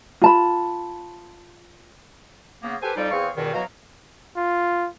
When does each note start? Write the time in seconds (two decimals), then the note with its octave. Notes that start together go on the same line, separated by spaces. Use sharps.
0.22 F4 A5 B5
2.62 C#3 A#3 B3
2.81 G4 A4 B4 C5 G#5
2.95 F2 F3 G3 D#4 D5
3.11 E2 C4 G#4 F5 C#6
3.35 E2 G2 B2 D#3
3.53 B2 E3 F#3 F#4 F5 A#5
4.37 F4